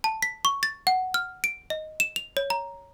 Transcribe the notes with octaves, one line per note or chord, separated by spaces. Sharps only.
A5
B6
C#6
A6
F#5
F6
D7
D#5
E7
F7
C#5
A#5